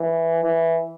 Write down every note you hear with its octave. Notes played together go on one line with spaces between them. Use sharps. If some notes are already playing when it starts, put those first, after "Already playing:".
Already playing: E3
E3